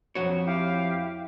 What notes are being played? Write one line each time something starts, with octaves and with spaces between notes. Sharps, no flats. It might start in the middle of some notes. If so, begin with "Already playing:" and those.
F2 F#4 C#5
E4 G4 F5